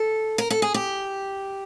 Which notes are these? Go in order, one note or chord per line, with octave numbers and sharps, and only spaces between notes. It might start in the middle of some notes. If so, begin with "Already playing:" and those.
Already playing: A4
A#4
A4
G#4
G4